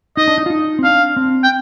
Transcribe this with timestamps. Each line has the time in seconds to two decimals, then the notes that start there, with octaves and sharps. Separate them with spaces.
0.17 D#4 D#5
0.28 D4
0.38 D#4
0.46 F4
0.50 D#4
0.79 C4
0.84 D4 F5
1.17 C4
1.43 G5